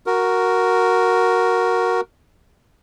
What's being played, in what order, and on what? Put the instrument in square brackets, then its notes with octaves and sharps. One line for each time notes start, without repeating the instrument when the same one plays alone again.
[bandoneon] F#4 A#4